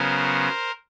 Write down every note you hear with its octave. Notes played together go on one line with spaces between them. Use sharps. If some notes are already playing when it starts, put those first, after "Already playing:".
Already playing: C#3 F#3 B3 A#4 C5